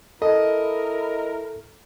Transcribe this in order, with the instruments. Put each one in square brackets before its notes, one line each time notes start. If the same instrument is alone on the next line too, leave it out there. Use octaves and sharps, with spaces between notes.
[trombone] E4 [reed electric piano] A4 [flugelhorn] A#4 [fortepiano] D#5